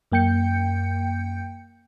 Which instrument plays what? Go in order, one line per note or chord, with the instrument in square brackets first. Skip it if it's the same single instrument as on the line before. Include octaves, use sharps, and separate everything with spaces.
[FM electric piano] F#2 A#3 G5 G6 C#7